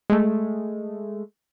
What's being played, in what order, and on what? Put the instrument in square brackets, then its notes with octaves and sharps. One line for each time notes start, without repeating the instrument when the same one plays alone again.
[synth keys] G#3 A3